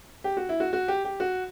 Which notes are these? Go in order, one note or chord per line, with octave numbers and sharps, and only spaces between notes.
G4
F#4
E4
F#4
F#4
G4
G4
F#4